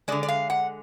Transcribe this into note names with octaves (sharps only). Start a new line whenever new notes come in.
D3 G#3 D5
D5
F5
F#5